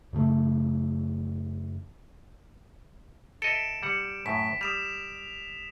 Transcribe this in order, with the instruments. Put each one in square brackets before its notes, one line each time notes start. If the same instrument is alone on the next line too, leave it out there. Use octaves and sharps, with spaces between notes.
[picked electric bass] F#2 C#3 A3
[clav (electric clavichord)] A4 D#5 E5 [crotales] D7 E7
[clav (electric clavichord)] G3 F#5
[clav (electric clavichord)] F#2 A2 [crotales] B6
[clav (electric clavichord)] G3 [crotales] D#6 E7 F7